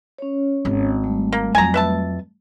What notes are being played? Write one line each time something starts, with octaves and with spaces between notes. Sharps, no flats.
C#4 C#5
G#1
G3 A3
A#3
F2 F#3 G#5 A#5
B4 E5 A5